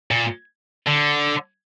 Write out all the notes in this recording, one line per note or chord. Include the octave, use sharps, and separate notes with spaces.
A#2
D3